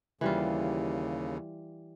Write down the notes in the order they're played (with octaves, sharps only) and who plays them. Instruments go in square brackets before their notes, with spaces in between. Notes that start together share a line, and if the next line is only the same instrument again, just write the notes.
[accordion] D#2 C#3 [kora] E3 G3 F4